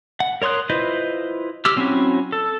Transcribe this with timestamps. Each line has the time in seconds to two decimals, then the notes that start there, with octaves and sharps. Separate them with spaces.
0.20 F#5
0.42 A#4 C#5 C6 D#6 F#6
0.69 E4 F4 B4 C5 D#5
1.65 G4 D6 E6 F6
1.76 F#3 C4 C#4 E4 F#4
2.32 A4